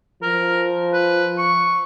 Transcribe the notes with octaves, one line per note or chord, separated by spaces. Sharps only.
F3 A#4
B4
C#6